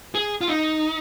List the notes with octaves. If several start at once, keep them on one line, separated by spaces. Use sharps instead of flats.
G#4
F4
D#4